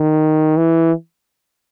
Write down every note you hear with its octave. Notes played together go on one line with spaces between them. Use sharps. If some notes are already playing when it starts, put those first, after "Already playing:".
Already playing: D#3
E3